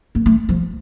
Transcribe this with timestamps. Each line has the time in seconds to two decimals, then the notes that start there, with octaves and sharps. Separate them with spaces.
0.15 A#3
0.26 A3
0.49 F3